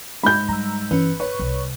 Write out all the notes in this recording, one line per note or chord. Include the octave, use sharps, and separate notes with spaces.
G#2 B5 G6
G3 A#5 E6
G1 E3 C#4 B4
B4 C#5 C#6
C2